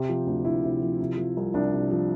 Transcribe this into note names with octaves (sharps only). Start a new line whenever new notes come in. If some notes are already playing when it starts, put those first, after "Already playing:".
Already playing: C3 G4
F3
D2
D2 E4
C3
F3
C3
F3
C2
C2 D4
C3
F3